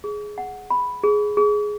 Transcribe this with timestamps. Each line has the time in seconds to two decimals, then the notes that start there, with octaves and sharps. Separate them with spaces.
0.04 G#4
0.38 F#5
0.70 B5
1.04 G#4
1.37 G#4